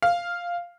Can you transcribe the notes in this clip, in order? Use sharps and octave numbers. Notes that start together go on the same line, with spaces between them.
F5